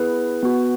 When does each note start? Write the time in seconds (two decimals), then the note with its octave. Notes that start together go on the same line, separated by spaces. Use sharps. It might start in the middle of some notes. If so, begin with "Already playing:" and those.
Already playing: B3 E4 G#4 B4
0.43 B3 F#4